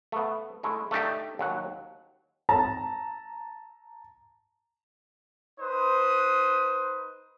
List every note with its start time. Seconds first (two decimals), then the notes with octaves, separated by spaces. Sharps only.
0.12 A3 B3
0.63 G#3 A3 E4
0.91 A3 D4 D#4 G4
1.39 D#2 F#3 F#5
2.49 A5 A#5
5.60 D#4 B4 C5 D#6